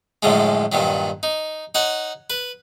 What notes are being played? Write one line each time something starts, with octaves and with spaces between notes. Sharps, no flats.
F#2 A2 D3 F3 G#3
G2 A#2 D#3 F#3
D#4
D#4 C#5 F#5
B4